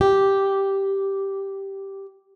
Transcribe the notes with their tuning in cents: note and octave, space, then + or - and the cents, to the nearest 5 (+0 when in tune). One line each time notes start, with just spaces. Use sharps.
G4 -5